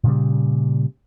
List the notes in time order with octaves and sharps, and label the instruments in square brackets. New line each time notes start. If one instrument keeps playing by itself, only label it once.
[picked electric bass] A#2 C#3 G3